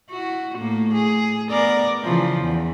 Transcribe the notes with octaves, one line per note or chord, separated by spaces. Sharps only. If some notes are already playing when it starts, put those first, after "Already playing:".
E4 F#4
A2 A#3
G#4
B3 A#4 D5
C#3 E3 F3
E2